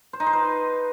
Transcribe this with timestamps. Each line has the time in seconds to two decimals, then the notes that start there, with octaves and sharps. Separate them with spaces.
0.13 C5
0.20 D#4
0.27 C5
0.33 B4